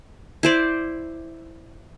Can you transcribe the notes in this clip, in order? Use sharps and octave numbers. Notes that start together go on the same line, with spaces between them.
E4 C5 D5